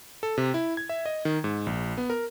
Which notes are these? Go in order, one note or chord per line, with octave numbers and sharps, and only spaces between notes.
A4
C3
E4
G#6
E5
D#5
D#3
G#2
A#1
B3
A#4